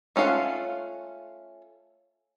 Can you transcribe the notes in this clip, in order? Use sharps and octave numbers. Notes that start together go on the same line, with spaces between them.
A3 C#4 F4 F5 F#5